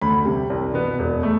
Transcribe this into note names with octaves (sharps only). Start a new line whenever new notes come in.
D2 B5
C3 G3
C2
B2 B3
E1
A3